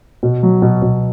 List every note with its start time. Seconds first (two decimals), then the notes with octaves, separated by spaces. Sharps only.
0.23 B2
0.43 F#3
0.62 B2
0.82 B2